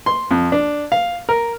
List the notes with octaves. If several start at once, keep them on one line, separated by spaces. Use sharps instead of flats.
C6
F2
D4
F5
A#4